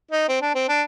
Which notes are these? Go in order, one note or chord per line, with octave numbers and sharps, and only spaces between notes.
D#4
C4
D4
C4
D4